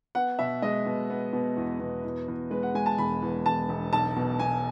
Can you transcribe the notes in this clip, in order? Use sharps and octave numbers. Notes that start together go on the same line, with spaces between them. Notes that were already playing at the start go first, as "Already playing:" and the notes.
B3 F#5
B2 E5
G#3 D#5
B2
B3
B2
E2
B2
E2
E2
G#3 B4
F#5
G#3 G#5
A5
E1 B5
E2
E1 A5
E1
B1 A5
B2
B2 G#5